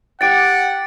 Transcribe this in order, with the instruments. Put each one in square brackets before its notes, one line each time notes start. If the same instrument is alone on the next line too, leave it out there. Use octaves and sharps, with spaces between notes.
[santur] G4 G5 [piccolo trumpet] F#5 [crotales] A6 D7